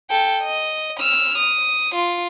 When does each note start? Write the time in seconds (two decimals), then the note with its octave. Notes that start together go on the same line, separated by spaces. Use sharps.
0.10 A4 G5
0.43 D#5
1.00 E6 F6
1.38 D#6
1.94 F4